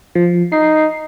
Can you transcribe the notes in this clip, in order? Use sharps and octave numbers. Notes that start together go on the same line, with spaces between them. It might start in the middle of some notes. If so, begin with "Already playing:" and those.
F3
D#4 C7